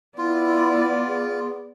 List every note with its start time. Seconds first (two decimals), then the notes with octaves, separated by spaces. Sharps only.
0.18 B3 E4 F4 D5
1.07 G#4